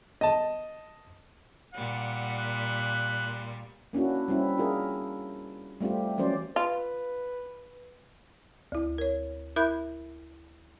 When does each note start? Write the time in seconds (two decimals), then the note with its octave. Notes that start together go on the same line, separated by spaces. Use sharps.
0.21 D#5 A5
1.75 A#2 G3 F#5
2.39 F#6
3.93 A#3 C#4 D4 E4 F#4
4.28 G3 C4 C#4 E4
4.58 D4 F4 G#4 A#4
5.81 G3 A3 C4 F4 G4
6.18 E3 F#3 C4 C#4 C5 D5
6.56 F4 B4
8.72 D2 E4
8.98 A#4 C#5
9.56 E4 A#4 E5 B5 F#6 G6